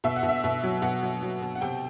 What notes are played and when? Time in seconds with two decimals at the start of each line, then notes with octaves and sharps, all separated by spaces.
0.04 B2 E5
0.16 F#5
0.23 B2
0.29 E5
0.44 B2
0.64 F#3
0.82 B2 F#5
1.02 F#3
1.23 F#3
1.42 B2
1.55 F#5
1.61 C3 G5